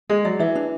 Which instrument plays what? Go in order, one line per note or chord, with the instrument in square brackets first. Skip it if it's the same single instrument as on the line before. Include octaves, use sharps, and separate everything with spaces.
[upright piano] G#3 [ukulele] G#4
[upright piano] F#3 [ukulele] D5
[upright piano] E3 [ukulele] E5
[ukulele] D4